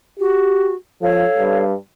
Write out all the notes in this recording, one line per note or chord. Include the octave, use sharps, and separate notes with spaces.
F#4 G4
F3 A4 C#5 F5
G2